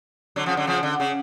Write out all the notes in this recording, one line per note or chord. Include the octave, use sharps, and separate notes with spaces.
D3 F#3
C#3 F3
D3 F#3
C#3 F3
D3
C#3